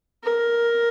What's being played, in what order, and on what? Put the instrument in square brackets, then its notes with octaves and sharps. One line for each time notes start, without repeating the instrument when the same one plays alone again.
[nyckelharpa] A#4